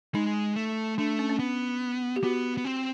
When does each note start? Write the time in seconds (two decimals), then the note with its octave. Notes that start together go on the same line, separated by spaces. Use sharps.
0.14 G#3 D#4
0.56 A3
0.98 A3 D4
1.19 C#4
1.30 C#4
1.40 B3
2.16 G4
2.23 B3 F#4
2.57 B3
2.65 C4